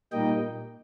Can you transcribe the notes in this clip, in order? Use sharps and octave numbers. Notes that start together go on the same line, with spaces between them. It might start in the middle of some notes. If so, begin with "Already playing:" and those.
A#2 G3 A#3 D#4 D#5 G5